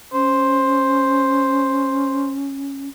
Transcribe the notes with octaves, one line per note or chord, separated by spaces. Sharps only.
C#4 C5